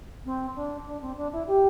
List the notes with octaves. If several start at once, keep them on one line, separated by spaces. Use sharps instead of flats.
C4
D4
D4
C4
D4
E4
G4